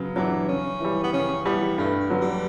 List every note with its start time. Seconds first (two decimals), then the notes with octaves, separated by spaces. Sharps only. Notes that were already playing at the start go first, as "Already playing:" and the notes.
Already playing: C#3 F#3 B3
0.16 E3 F#3 B3 D4
0.48 C#3 C#4
0.80 E3 G3
1.04 B3
1.13 C#3 C#4
1.45 E3 G3 B3
1.78 G2 A3
1.99 G3
2.10 D3 F#3 B3
2.21 G3